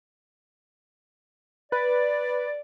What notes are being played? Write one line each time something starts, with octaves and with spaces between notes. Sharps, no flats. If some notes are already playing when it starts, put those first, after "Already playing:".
B4 D5